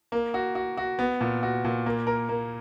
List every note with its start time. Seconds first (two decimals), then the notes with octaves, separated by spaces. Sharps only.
0.12 A#3
0.34 F#4
0.55 F#4
0.77 F#4
0.99 B3
1.21 A#2
1.43 F#4
1.65 A#2
1.86 A#3
2.07 A#4
2.29 A#3